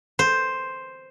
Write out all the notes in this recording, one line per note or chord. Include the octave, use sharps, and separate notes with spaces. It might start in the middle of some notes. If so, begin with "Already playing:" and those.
C5